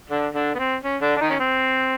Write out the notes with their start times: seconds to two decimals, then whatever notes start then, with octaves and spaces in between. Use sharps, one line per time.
0.10 D3 D4
0.34 D3 D4
0.55 B3
0.59 C4
0.84 C#4
1.02 D3 D4
1.17 D4
1.21 D#3 D#4
1.30 C#4
1.40 C4